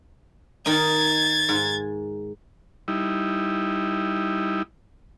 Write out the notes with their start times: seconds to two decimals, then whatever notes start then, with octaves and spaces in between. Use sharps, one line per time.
0.66 D#3 D#4 G#6 A6
1.49 G#2
2.88 G3 D#4 E4